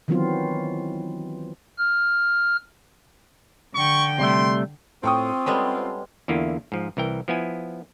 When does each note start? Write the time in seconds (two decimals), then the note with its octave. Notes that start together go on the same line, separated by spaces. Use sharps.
0.08 D#3 E3 F#3 B3 C4 F4
1.78 F6
3.75 D3 G5 C#6
4.19 C3 G3 A3 C6
5.04 A2 C4 F4 G5 C#6 D#6
5.46 G3 G#3 B3 C#4 A4
6.28 E2 D3 A#3 E4 F4
6.72 G#2 F3
6.97 C2 E3 A#4 G5
7.28 F3 B3 E4 G#5